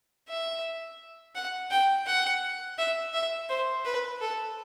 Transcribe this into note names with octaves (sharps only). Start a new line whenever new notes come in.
E5
F#5
G5
F#5
E5
E5
C5
B4
A4